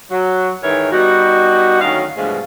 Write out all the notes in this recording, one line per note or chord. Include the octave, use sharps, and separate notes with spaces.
F#3 F#4
G#2 D#3 E3 A#4 C#5
G3 B3 D#4 F#4
D2 D#3 F#3 C#4 F5
G2 B2 E3 F3 G#3 A3